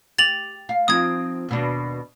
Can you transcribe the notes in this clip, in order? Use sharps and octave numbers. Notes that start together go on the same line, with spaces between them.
G4 A6 F7 F#7
F5
F3 C4 D#4 D#6 G#6
D#2 B2 D4